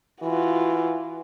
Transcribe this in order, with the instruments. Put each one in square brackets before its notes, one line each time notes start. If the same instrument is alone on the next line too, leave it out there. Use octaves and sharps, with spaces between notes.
[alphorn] E3 [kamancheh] F4 F#4